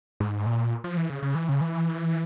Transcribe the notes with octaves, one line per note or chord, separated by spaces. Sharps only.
G#2
A#2
F3
E3
C#3
C#3
E3
C#3
E3